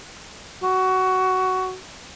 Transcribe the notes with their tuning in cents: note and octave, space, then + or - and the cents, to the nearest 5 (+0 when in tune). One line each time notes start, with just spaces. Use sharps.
F#4 +15